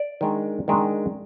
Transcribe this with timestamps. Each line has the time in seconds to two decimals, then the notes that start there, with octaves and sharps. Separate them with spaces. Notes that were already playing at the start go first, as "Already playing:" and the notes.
Already playing: D5
0.21 D#3 G#3 D4
0.68 D#3 G#3 D4